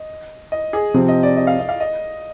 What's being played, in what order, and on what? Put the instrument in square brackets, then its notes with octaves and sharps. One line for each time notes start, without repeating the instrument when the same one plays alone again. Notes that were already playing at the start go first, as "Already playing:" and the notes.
Already playing: [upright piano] D#5
D#5
G#4
[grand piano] C3 F3 C4
[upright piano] D#5
D5
D#5
F5
D#5
F5
D#5